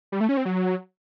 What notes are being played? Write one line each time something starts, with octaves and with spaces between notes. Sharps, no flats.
G3
A3
C#4
C4
F#3